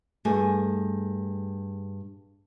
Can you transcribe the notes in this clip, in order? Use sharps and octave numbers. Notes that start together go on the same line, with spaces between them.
G2 A3 G#4